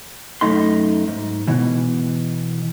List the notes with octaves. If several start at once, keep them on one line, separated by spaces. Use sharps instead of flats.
F#2 A3 D#4 C6
G#2
B2 E3